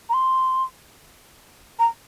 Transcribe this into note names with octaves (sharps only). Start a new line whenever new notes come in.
A#5
C6
A#5